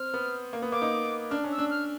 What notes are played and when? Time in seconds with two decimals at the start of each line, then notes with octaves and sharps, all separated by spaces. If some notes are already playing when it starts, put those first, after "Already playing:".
Already playing: C4 F6
0.14 B3
0.53 A#3
0.62 B3
0.72 A#3 D6
0.82 D#4
1.31 D4 F6
1.44 C#4
1.51 E6
1.58 D4
1.70 F6